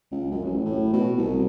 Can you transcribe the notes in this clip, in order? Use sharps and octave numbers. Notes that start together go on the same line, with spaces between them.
C#2
F#2
A1
A2
B2
C2